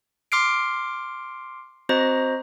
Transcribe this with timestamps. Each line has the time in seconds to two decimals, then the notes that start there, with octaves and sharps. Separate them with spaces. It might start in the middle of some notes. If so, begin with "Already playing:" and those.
0.32 C6 D6 F6 C7 D7
1.89 C4 F#4 C5 D#5 A#5